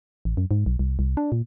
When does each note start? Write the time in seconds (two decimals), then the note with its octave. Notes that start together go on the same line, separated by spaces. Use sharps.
0.25 A1
0.37 F#2
0.51 G#2
0.66 B1
0.79 C2
0.99 C2
1.17 D4
1.32 A#2